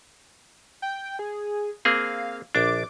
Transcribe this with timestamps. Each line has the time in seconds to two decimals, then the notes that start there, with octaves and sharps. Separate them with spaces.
0.82 G5
1.19 G#4
1.85 A#3 C4 G#4 F5
2.55 A#1 D4 D6